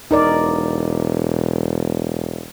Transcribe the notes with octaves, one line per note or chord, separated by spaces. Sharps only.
E1 D#4 A#4 D5